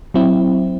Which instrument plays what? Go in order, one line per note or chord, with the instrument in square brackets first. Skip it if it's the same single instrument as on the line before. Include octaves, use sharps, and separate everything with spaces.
[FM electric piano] F#3 C4 E4